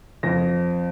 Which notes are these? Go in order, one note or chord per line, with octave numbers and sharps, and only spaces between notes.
F2 A#6